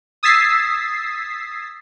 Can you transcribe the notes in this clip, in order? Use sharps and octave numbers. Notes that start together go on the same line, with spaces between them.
D#6 E6 G#6 A6 B6 C7